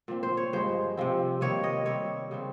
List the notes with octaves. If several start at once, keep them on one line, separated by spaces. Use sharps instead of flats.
A#2 F3 C4
C5
C#5
G2 F3 G#3 C5
C3 F3 C4
C3 D#3 G3 A#3 C#5
D#5
C3 G3 C4 C#5
C#3 G3 C4